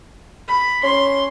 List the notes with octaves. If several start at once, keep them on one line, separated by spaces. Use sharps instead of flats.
B5
C#4 C6